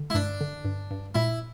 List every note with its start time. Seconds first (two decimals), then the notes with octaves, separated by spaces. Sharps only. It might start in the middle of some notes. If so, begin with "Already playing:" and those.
Already playing: D3
0.10 E4
0.14 G2 D4
0.41 D3
0.65 G2
0.91 G2
1.15 A#2 E4